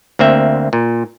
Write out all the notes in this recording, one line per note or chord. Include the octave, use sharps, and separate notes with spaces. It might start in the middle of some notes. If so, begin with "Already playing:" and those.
D2 A#3 C4 E5
A#2